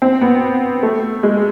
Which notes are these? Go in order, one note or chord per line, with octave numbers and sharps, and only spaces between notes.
C4
B3
A3
G#3